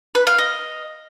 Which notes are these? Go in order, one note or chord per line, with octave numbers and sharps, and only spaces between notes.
B4
F5
D#5